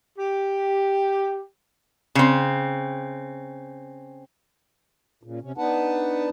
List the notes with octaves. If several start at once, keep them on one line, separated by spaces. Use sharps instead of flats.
G4
C#3 C4
A#2 C#3
C3 C#4
B3 D4 D#4 B4 F#5 A5